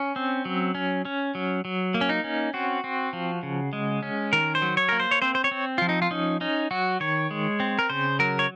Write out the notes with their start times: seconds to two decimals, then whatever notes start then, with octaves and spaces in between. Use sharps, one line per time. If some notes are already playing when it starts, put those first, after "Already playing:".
Already playing: C#4
0.16 C4
0.45 F#3
0.75 C#4
1.05 C#4
1.35 F#3
1.65 F#3
1.94 A#3
2.01 C#4
2.09 D#4
2.24 C#4
2.54 C4 F#4
2.84 C4
3.13 F3
3.43 C#3
3.73 G#3
4.03 C#4
4.33 D#3 A#4
4.55 C5
4.62 F#3
4.77 C#5
4.89 A#3 A#4
5.00 C5
5.11 C#5
5.22 C4 C5
5.35 C5
5.44 C#5
5.51 C4
5.78 F3 F4
5.89 D#4
6.02 F4
6.11 C#4 D#4
6.41 C#4 D#4
6.71 F#3 F#4
7.00 D#3 C#5
7.31 G#3
7.60 C4
7.79 A#4
7.90 C#3 C5
8.19 F#3 A#4
8.39 C#5